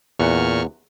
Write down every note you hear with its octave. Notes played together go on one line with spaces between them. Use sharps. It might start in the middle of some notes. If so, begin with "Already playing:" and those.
E2 A#2 F#5 C#6 F6